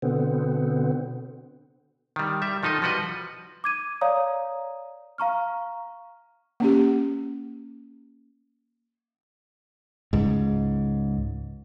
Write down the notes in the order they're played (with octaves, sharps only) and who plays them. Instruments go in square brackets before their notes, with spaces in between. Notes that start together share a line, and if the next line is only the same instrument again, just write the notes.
[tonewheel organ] B2 D3 B3 C4
[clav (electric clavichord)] D#3 G3
G3 E5
D#3 F3 D#4 A4 D#5
F3 G3 F#4 B4 D#5
[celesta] D6 G#6 D#7
C#5 D5 F5 A#5 D#6
F5 A#5 C#6 F6
[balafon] A#3 C#4 G4
[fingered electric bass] C#2 G#2